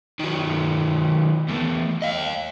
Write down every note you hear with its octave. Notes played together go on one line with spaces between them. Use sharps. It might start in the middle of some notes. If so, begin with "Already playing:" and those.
D#3 F#3
E2 A2
D#5 F5